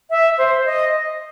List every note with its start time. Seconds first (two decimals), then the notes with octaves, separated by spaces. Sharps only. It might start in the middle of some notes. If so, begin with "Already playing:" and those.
0.10 E5
0.38 C5
0.66 D#5